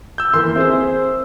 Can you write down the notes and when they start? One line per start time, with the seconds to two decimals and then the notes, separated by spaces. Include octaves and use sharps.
0.18 E6 G6
0.34 E3 A#3 C6
0.56 C4 G#4 C5 E5